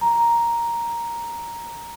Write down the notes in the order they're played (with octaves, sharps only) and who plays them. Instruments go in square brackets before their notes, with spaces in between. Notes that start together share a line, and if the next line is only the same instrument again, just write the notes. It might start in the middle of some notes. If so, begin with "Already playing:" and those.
[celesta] A#5